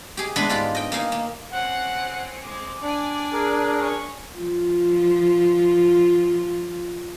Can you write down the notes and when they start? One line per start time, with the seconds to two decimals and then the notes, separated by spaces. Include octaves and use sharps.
0.17 G4 G#4
0.36 G#3 B3 D4 B4 E5
0.49 G#2 F4 G4 B5
0.75 D#5 G5
0.92 A#3 D#4 F5 G#5
1.12 A#3
1.51 C4 C#4 F#5
2.44 G#3 C4 D6
2.82 D4 D5 G#5
3.32 G#4 A#4
3.80 C#4 C#6
4.38 F3 F4